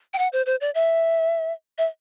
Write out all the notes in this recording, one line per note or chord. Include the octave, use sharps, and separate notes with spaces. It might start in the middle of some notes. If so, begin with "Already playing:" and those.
G5
F#5
C5
C5
D5
E5
E5